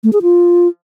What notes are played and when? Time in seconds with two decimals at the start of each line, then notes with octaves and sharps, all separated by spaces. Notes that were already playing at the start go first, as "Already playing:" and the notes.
0.04 A3
0.13 G#4
0.22 F4